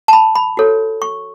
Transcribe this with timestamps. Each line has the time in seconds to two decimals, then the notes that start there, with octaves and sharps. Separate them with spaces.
0.08 A5
0.13 B5
0.35 B5
0.57 F#4 A4 C#5
1.02 C#6